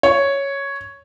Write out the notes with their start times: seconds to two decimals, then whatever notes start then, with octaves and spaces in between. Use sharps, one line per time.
0.03 C#5